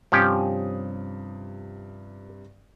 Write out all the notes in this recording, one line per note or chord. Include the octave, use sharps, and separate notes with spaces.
G2 C3 F3 C#4 G4 D#6